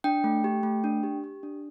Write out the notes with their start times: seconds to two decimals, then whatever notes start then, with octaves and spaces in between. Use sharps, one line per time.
0.04 D4 G5
0.24 A3
0.44 G4
0.63 A3
0.84 D4
1.03 G4
1.24 G4
1.43 D4